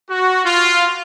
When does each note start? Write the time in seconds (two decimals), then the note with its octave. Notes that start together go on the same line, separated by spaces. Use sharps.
0.10 F#4
0.45 F4